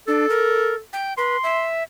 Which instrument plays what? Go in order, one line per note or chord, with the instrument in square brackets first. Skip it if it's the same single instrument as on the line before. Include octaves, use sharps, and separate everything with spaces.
[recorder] D4 [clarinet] A4
[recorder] A#4
G5
[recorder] B4 [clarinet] C6
[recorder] E5